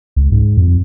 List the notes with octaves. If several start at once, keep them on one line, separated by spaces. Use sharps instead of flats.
C#2
G#2
F2